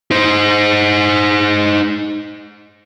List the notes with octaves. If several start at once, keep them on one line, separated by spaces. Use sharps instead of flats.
D#4 C5